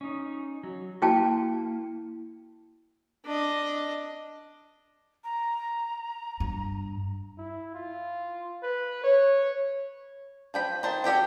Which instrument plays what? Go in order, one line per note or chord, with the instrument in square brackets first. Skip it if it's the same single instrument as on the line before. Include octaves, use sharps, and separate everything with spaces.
[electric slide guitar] C#4 D#4
F#3
[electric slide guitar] A#3 [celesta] E4 [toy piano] F#4 G5 A5
[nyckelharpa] D4 D#5
[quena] A#5
[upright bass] G2
[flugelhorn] E4
F4
B4
C#5
[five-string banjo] F3 G5 B5
D#3 C5 A5
F#4 G4 A4 G5